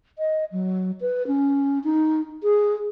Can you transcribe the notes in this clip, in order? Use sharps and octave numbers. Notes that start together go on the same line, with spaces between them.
D#5
F#3
B4
C#4
D#4
G#4